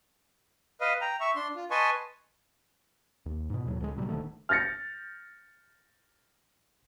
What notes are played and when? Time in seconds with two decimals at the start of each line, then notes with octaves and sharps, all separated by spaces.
0.81 B4 D#5 F5
1.01 G5 A#5
1.20 E5 C#6
1.36 D4 C6
1.56 F4
1.71 B4 D#5 G#5 A5 C6 C#6
3.26 D#2
3.50 G#2 B2
3.66 D#2 A2 F#3
3.81 C#2 D3 G3 G#3
3.96 A2 C3 F#3 G3
4.09 D1 D3 D#3 A3
4.49 F6 G6 A6 A#6 C#7